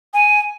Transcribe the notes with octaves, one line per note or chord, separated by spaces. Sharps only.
G#5